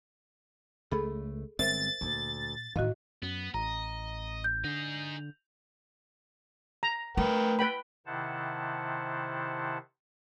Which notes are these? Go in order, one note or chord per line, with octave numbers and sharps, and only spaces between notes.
C#2 A3 G#4 A4 B5
G1 G#3 C4 A#4 C5 E5 A6
D2 A#2
A2 D#3 E4 F#4 D#5 F5
F#2 B3
A1 D#5 A#5
G6
D3 D#4 G#4
A#5
A3 A#4 B4 G5
B4 G5 B5
C3 D#3 E4 C5 F#5 A5